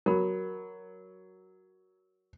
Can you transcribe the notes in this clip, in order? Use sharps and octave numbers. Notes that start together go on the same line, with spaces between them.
F#3 A#4 B5